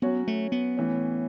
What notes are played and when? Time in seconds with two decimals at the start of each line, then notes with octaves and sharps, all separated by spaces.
0.02 F#3 B3 C#4 F#4 C#5
0.28 A3
0.52 B3
0.77 A2 E3 C#4